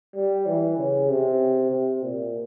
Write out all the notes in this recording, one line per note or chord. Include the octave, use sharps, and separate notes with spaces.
G3
E3
C#3
C3
C3
A#2